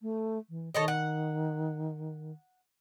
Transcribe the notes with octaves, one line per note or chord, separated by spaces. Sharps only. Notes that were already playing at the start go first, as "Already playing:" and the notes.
A3
E3
D#3 A4 C#5 D#5
F#5